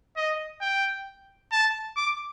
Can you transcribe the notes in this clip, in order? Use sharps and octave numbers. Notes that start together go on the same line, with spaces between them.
D#5
G5
A5
D6